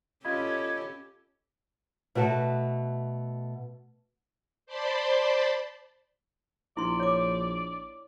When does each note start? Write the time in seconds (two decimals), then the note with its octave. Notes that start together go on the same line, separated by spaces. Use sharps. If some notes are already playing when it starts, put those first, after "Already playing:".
0.25 C#4 F4 G4 A4 D#5 B5 G#6
2.15 B2 A3 F#4 A4
4.66 C5 D5 A5 B5 C6
6.77 A#1 E4 D5 C6
7.00 C#5 D6